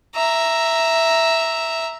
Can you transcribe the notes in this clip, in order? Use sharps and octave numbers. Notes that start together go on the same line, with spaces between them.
E5 A#5